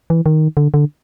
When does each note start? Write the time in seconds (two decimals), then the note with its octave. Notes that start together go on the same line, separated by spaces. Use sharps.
0.10 E3
0.26 D#3
0.57 D3
0.74 D3